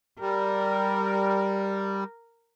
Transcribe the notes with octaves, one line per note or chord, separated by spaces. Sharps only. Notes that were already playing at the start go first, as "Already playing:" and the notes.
G3 A#4